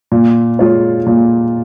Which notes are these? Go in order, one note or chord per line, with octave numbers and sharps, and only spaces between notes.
A#2
G#3 F4 C#5
A#2